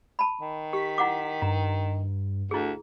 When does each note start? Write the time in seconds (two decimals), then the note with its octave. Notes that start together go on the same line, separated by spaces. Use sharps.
0.19 A5 B5
0.41 D#3
0.73 G4 B6
0.98 E4 F#5 D6
1.42 G2 A#5
2.51 D2 E4 G#4